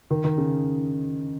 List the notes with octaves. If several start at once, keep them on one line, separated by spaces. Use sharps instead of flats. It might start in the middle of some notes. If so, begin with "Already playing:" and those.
D#3
D#3
C#3